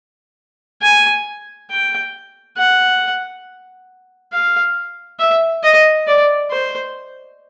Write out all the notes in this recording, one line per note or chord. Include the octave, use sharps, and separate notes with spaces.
G#5
G5
F#5
F5
E5
D#5
D5
C5